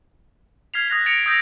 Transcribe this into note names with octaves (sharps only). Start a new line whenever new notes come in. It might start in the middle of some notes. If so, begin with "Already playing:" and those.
F6 G#6 B6 C7 F7
D#6 F#6 A#6 F7
A6 A#6 C#7 D7 F7
D#6 E6 G6 A#6 F7